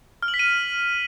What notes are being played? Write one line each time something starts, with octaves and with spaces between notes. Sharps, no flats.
F6
F#7
B6
D#7